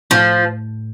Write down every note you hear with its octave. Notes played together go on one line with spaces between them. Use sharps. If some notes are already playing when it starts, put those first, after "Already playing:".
A2 F3